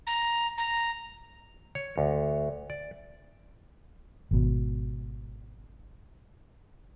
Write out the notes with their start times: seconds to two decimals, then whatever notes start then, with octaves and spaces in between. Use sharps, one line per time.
0.07 A#5
0.58 A#5
1.75 C#5
1.98 D2
2.70 D5
4.31 G#1 B2